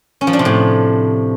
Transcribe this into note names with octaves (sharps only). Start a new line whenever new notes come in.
C#4
F3
D4
C3
A2